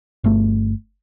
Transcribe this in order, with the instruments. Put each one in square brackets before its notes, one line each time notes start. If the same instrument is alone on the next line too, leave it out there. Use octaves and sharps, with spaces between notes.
[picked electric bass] G1 A3